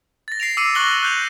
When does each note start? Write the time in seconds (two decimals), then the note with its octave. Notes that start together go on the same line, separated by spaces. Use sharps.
0.28 A6 A#6
0.40 C7 D7 F7
0.57 D6 E6 C#7 D#7
0.75 C#6 E6 F#6 A#6 F#7 G7
1.03 F#6 G6 F7